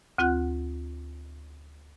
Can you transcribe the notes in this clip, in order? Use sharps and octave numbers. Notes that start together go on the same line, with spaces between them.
D2 C4 F4 F#5 F#6